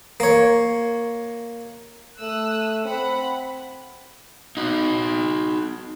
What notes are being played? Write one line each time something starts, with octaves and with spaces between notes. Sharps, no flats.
A#3 C#5
A3 D#6 E6 F#6
C4 F#5 B5
D#4 F#4